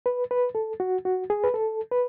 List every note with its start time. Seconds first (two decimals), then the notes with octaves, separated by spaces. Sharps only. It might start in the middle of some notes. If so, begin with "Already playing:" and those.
0.06 B4
0.31 B4
0.55 A4
0.80 F#4
1.05 F#4
1.30 G#4
1.44 B4
1.54 A4
1.91 B4